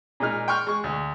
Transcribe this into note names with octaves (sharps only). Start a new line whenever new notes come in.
A#2 G#3 D#4 F6
G5 C6 C#6 F6
G#3 C#6
D2